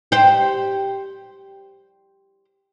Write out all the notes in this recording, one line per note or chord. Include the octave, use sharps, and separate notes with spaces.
G4 C5